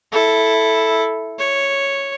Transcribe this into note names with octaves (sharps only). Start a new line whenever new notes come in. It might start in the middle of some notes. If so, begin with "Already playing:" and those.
E4 A4
C#5